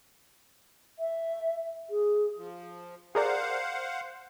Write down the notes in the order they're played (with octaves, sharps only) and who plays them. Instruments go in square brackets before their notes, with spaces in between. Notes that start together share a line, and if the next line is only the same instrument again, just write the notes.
[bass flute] E5
G#4
[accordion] F3
[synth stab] G#4 A#4 D5 [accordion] C5 F5 F#5